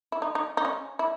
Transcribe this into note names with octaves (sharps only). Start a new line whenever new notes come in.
E4
D#4
D#4
D#4
C#4
E4